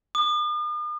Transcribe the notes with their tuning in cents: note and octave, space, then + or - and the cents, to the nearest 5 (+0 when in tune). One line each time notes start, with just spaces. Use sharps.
D#6 -45